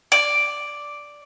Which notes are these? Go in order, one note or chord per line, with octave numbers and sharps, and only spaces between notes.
D5